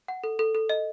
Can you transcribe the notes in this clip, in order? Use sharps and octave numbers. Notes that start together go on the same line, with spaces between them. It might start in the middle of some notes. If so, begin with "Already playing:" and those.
F#5
A4
A4
A4
D#5